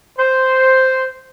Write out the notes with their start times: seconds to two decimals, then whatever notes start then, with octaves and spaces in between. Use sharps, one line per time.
0.18 C5